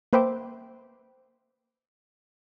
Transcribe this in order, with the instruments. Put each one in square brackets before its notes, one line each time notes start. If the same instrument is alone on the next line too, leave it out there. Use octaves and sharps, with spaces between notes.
[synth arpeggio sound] A#3 B4 C5 E5 G5 D6